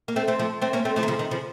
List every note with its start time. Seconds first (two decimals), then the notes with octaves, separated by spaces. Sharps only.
0.08 A#3
0.16 A3 C4
0.28 A3 C4
0.39 F3 A3
0.62 A3 C4
0.73 A#3 C#4
0.85 A3 C4
0.96 F3 A3
1.03 D#3
1.08 C#3 F3
1.19 D#3
1.31 C#3 F3